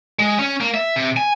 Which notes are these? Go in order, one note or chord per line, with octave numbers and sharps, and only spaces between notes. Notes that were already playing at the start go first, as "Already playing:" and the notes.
G#3
C#4
A#3
E5
C3
G#5